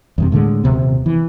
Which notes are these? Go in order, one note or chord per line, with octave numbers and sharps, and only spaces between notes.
E2 G2 C3
A2 D3 D#3 G#3
D#1 G#1 C3 B3
E3